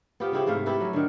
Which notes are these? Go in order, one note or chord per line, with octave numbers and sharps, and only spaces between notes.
B3 C4 F4 G4
C#3 C4 E4 G4
G#2 C3 A3 F5
E4 G4 A4 B4
F#3 C#4
D3 D#3